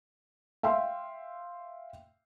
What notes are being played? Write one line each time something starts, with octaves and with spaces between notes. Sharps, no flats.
E5 F5 G5 C6